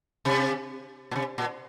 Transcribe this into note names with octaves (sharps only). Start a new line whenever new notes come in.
C3
A#2
C3
A#2